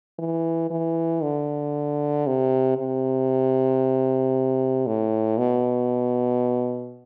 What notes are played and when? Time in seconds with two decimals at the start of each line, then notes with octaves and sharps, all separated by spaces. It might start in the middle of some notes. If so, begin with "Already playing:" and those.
0.19 E3
0.70 E3
1.23 D3
2.27 C3
2.78 C3
4.87 A2
5.38 B2